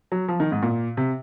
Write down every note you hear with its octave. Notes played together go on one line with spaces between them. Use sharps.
F#3
F3
D#3
G#2
A#2
C3